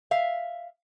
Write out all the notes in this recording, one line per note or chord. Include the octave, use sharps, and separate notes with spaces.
E5 F5